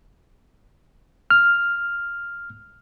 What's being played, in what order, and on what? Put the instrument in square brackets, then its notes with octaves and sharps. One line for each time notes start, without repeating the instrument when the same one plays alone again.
[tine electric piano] F6